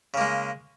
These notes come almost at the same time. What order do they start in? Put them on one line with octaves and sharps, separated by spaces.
C#3 A#3 G#3